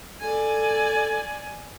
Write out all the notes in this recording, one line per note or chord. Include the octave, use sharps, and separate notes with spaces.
A4 D5 G#5